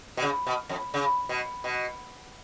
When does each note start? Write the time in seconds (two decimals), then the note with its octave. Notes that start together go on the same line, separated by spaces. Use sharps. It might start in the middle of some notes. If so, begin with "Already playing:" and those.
0.17 B2
0.22 C#3
0.47 B2
0.69 F2
0.94 C#3
1.29 B2
1.64 B2